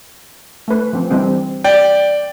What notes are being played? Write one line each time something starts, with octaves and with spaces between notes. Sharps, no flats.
A3 B4
F3 C4
E3 G3 C4
D5 G5